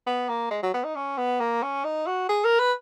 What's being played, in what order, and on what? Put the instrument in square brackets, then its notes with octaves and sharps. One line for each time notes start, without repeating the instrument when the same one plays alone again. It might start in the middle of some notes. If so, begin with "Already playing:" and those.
[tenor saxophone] B3
A#3
G#3
F#3
B3
D#4
C#4
B3
A#3
C#4
D#4
F#4
G#4
A#4
B4